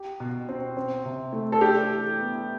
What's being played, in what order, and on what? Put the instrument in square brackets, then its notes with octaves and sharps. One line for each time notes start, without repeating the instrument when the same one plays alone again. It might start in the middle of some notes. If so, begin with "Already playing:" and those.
Already playing: [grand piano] G4
B2
C4
C4
C3
A3
[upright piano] A4
[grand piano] D4 [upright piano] G4
[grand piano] E3
B3